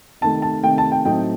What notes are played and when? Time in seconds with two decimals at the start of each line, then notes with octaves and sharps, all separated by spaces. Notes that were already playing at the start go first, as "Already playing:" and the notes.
0.21 C3 D#3 A3 A5
0.42 A5
0.63 C3 D#3 A3 G5
0.78 A5
0.92 G5
1.05 A2 F#3 C4 D#4 G5